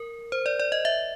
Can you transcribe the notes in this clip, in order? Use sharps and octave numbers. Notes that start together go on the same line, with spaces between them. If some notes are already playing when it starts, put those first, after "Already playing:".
Already playing: A#4
C5
D5
D5
D#5
E5